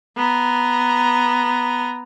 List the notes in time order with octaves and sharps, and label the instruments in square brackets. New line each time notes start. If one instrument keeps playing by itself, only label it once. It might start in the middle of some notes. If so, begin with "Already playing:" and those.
[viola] B3 A#5